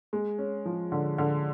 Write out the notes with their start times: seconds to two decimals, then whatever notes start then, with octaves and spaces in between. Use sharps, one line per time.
0.13 G#3
0.38 C#4
0.66 F3
0.92 D3
1.18 D3